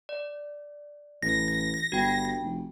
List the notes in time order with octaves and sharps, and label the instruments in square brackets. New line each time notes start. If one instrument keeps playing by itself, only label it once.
[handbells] D5
[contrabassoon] A1 [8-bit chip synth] A#6
[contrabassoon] G1 [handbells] F#4 G5
[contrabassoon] F1